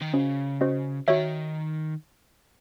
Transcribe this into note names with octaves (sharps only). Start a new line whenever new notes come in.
D#3
C#3 C#4 F#4 C5 D#5
C#4 F#4 C5 D#5
D#3 F#4 C#5 E5